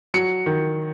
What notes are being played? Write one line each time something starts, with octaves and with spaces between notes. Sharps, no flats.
F#3 C#7
D#3